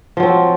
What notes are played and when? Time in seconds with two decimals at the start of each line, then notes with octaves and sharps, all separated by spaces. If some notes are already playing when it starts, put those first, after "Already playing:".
0.17 F3
0.20 F#3
0.23 C4